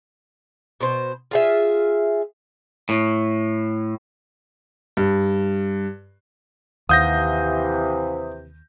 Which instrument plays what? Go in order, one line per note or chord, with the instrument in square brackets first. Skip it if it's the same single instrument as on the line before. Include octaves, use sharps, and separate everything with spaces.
[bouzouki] B2 C5
F4 G#4 E5
[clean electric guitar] A2
[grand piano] G2
[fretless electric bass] D#2 [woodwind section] C3 E3 [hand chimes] F5 F#5 [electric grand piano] D#6 G6 A#6